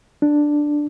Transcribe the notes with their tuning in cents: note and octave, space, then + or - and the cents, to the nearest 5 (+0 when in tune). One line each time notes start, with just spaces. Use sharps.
D4 +5